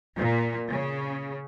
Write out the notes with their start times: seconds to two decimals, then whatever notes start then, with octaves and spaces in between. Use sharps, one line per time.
0.17 A#2
0.69 C#3